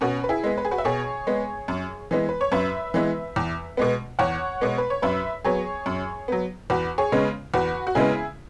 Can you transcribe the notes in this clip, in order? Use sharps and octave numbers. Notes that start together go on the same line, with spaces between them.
B2 C#4 F#4
B4
E4 G#4
G#3 B3
B4
G#4
F#4 B4
E5
B2 G#4 C#5
G#3 B3
F#2
E3 G#3 B3
B4
C#5
F#2 B4 E5
E3 G#3 B3
E2
B2 G#3 B3
E2 C#5 F#5
B2 G#3 B3
B4
C#5
F#2 B4 E5
F#3 B3 G#4 C#5
F#2
F#3 B3
E2 F#4 B4
G#4 C#5
C#3 G#3 B3
E2 F#4 B4
F#4
C#3 G#3 B3 E4 G#4